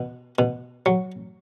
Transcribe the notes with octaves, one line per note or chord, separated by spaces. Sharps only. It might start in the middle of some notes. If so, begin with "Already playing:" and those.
Already playing: B2
B2
F#3